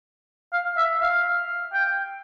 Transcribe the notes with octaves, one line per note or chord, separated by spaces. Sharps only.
F5
E5
F5
G5